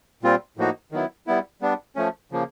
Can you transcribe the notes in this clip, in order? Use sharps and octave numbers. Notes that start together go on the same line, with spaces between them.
A#2 G3 C4 F4
A2 F3 A#3 D#4 F#4
D#3 F#3 B3 E4
G3 B3 E4
G3 B3 D4
F3 A3 C#4
C#3 F3 A#3